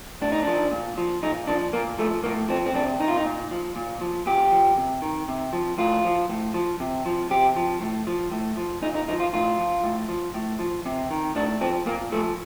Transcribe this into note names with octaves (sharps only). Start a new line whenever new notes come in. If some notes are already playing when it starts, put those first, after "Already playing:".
A2 D4
D#4
F3 D4
A#2
F3
A#2 D#4
F3 D4
A#2 A#3
F3 A3
A2 A#3
F3 C4
C4
C3 D4
D#3 D#4
F4
D#4
A#2
F3
A#2
F3
A#2 G4
F3
C3
D#3
C3
F3
A2 F4
F3
A2
F3
C3
F3
C3 G4
F3
A2
F3
A2
F3
A#2 D#4
D#4
F3 D#4
F4
A2 F4
F3
A2
F3
A2
F3
C3
D#3
A2 D4
F3 C4
A#2 A#3
F3 A3